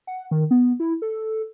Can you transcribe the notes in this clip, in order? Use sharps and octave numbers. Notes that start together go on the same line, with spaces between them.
F#5
D#3
B3
E4
A4